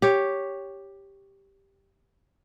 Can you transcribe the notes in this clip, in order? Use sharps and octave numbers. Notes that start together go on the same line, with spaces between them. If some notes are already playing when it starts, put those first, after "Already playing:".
G4 C#5